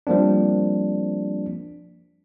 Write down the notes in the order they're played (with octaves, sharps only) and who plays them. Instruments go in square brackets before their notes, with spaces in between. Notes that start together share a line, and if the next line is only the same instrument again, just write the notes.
[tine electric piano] F3 G3 A#3 C4 D4